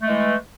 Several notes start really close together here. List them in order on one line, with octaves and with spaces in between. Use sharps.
A3 G#3 E3